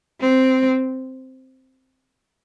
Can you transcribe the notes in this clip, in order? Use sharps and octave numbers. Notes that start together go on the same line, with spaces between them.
C4